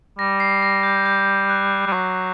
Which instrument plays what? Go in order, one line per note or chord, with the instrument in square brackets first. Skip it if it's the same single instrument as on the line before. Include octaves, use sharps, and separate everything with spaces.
[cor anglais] G3 [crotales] A#6
[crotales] C7
A#6
G6
G6
F#6
[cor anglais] G3
[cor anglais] F#3 [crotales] D6